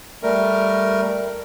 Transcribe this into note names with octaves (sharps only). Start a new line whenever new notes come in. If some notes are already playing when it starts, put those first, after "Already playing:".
G3 A3 A#4